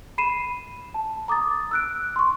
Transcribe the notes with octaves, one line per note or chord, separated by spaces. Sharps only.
B5 C7 D#7 E7
A5
A#5 D6 D#6 A6
E6 F#6 D7
C6 C#6